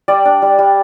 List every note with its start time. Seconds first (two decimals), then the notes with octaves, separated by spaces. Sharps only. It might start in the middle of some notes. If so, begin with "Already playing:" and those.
0.08 G3 D5
0.25 D4
0.42 G3
0.59 G3